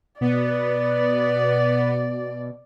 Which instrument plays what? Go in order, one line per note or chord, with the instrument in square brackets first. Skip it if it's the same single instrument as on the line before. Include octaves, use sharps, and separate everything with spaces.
[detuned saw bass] B2 [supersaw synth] B3 [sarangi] D5